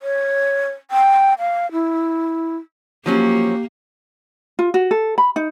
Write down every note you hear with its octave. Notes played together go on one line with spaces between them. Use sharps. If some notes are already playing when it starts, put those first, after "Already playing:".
C#5
G5
F5
E4
F3 F#3 A#3 C#4 G4
F4
F#4
A4
B5
D#4